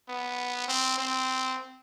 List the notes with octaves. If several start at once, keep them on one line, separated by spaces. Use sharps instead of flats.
B3
C4
C4